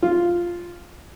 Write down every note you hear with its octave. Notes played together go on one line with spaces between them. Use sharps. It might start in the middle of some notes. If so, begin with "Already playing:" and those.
F4